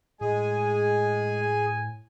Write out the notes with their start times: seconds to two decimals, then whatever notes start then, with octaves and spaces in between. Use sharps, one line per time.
0.21 A2 G#3 G#4 G#5